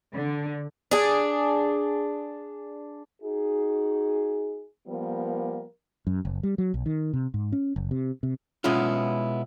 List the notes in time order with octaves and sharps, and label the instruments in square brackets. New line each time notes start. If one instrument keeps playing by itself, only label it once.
[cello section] D3
[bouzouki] D4 G#4
[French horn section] D#4 F#4 G#4
F3 G3 A#3 B3 A#4
[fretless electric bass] F#2
F#1
G3
F#3
B1
D#3
C3
G#2
C#4
F#1
C3
C3
[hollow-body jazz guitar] B2 G#3 B3 C#4 E4 F4